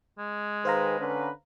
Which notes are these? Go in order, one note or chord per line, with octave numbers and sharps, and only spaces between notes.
G#3
D#3 G#4 B4 C5 F5 A#5
D3 C#4 B4